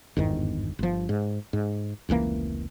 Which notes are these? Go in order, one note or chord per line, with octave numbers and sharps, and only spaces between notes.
G1 E2 G#2 D#3
G1 F3
G#2
G#2
F1 C#2 E3 A#3